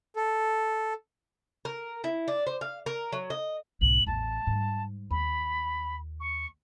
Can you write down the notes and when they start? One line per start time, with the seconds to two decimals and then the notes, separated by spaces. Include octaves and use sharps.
0.16 A4
1.65 A#4
2.04 E4
2.28 D4
2.47 C5
2.61 F5
2.86 A#4
3.12 F#3
3.30 D#5
3.81 B1 G#2 F#7
4.07 A1 E2 A5
4.47 G#2 G3
5.11 D#2 B5
6.20 C#6